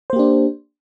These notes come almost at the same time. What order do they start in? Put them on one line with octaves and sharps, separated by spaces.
C5 A#3 G4 D4